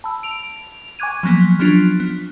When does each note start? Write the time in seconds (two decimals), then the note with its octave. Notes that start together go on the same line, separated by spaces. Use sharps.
0.04 A5 B5 E6
0.23 D7 F7
0.99 G#5 C#6 D6 F#6 G#6 D#7
1.23 F3 F#3 A#3 B3
1.59 F3 F#3 B3 C#4 D4 F4
2.00 B3